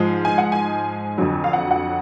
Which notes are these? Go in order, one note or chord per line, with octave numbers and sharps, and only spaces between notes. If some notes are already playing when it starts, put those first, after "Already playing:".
Already playing: G#2 F3 G#3
G#5
F#5
G#5
F2 D3 F#3
F5
F#5
F#5